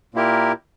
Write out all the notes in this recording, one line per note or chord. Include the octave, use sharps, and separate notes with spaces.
A#2 A#3 E4 G4 A#4